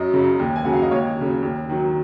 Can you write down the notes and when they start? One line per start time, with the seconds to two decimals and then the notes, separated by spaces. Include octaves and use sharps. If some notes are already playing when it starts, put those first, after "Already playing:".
Already playing: F#2 D#5
0.14 C#3 F#3
0.39 D#2
0.56 G#5
0.64 C#3 F#3 F#5
0.73 F5
0.82 D#5
0.91 D#2 C#5
1.17 C#3 F#3
1.42 D#2
1.69 D#3 F#3